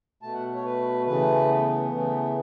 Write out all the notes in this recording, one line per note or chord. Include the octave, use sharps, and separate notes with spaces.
B2 A3 A5
F#5
C#5
B4
C#3 E3 A3 B4
B3
C#3 E3 A3